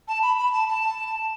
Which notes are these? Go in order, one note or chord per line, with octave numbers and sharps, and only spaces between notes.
A5
B5
B5
A5
A5